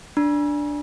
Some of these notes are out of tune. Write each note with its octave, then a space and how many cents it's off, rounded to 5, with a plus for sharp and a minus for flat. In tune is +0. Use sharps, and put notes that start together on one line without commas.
D4 +0 B5 -45